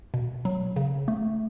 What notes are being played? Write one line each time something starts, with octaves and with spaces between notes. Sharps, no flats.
B2
F#3
C#3
A3